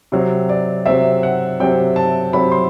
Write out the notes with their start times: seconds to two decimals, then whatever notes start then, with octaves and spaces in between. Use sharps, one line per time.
0.12 C3 F#3 C4
0.49 D5
0.86 C3 F#3 C4 E5
1.23 F#5
1.60 C3 F#3 C4 G5
1.96 A5
2.33 C3 F#3 C4 B5
2.52 C6